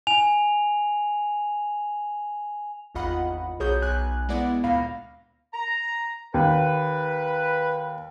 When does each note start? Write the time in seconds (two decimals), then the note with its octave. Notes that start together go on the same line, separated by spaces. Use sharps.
0.07 G#5 F7
2.95 G#1 E2 F4 D#5 F#5 B5
3.60 B1 F#4 G#4 C#5 D#6 G6
3.82 B1 G#5 F#6
4.29 G#3 B3 E4 D5 F#5
4.63 D2 A#2 F5 B5 A#6
5.53 A#5
6.34 D#2 B4